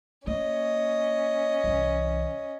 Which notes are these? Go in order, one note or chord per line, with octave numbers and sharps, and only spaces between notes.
A#3 C#4 D#5
C2 E3